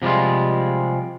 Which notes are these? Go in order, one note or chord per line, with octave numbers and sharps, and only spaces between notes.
C3 F3 G3 G#3 F4